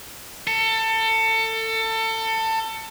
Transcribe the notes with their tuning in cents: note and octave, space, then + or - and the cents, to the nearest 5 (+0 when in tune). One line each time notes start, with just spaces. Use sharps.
A4 +25